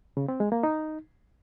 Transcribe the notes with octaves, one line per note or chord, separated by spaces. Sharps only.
C#3
C4
G#3
A#3
D#4